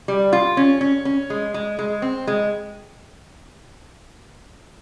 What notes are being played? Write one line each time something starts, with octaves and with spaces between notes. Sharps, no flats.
G3
F4
C#4
C#4
C#4
G#3
G#3
G#3
C4
G#3